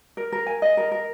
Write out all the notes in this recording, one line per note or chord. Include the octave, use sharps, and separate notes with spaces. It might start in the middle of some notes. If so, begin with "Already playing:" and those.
A#4
A#4
G#5
D#5
A#4
A#4